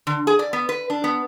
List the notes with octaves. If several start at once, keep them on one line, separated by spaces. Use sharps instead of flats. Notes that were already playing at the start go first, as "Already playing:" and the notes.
D3
G#4
D5
B3
B4
D4
B3